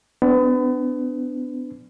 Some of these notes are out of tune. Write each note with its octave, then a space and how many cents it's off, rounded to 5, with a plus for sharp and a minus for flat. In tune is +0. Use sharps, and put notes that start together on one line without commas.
B3 +35 D4 +0